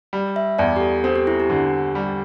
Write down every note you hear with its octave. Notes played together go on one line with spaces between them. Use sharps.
G3
E5
E2 D5
G4
A4
C4 A4
G4
E4
G4
D3
G3